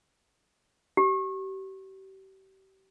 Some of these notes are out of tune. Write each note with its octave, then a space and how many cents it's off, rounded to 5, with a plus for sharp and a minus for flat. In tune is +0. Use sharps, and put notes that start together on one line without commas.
G4 -35